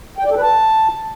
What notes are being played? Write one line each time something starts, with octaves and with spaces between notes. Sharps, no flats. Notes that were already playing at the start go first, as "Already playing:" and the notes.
G5
D5
A4
B4
A5